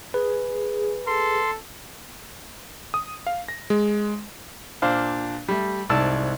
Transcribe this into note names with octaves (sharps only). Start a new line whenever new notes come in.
G#4 B4
A4 C6
D#6
F5
A#6
G#3
A#2 D4 C5 F5 F6
G3 A3
C2 G#2 D5 A5 E6